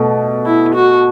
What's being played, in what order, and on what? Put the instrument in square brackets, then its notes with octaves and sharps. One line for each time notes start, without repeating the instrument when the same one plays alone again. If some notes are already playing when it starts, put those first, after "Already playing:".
Already playing: [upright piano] B2 A3
[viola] E4
F#4